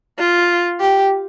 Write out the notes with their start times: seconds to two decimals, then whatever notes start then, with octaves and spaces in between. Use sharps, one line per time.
0.19 F4
0.80 G4